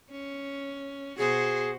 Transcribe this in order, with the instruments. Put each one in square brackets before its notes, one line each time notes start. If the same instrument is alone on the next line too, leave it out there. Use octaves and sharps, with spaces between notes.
[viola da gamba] C#4
[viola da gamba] B2 F#4 C5 [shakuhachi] G#4